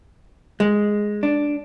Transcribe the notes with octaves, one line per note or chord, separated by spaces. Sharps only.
G#3
D4